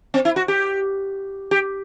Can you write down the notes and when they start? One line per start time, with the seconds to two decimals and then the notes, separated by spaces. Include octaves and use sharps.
0.14 C4
0.25 E4
0.36 F#4
0.48 G4
1.51 G4